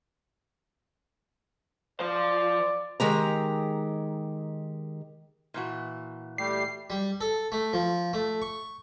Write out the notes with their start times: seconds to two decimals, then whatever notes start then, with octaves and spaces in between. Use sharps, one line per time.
2.00 F3 C5 D5
3.00 D#3 G#3 G4 A#5
5.54 A#2 E3 F#4
6.38 G3 A3 G4 C7
6.90 G3
7.21 A4
7.52 A3
7.73 F3
8.13 A3
8.42 C#6